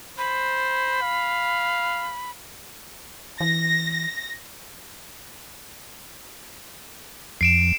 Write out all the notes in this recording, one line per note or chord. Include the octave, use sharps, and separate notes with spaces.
C5 B5
F5
E3 A#6
F2 C7 D7 E7